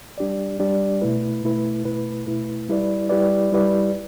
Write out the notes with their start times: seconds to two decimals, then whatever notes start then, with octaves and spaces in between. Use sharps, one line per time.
0.18 G3 D4 G4 D5
0.59 G3 D4 G4 D5
1.02 B2 A3 E4 B4
1.43 B2 A3 E4 B4
1.85 B2 A3 E4 B4
2.27 B2 A3 E4 B4
2.69 G3 E4 G4 B4 D5
3.09 G3 E4 G4 B4 D5
3.52 G3 E4 G4 B4 D5